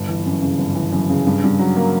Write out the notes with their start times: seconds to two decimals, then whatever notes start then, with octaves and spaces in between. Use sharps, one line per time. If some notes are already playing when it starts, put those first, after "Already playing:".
Already playing: G1
0.08 E3
0.26 F#2
0.42 C#3
0.59 G1
0.75 E3
0.92 F#2
1.10 C#3
1.27 G2
1.44 G2
1.59 F#3
1.77 A#3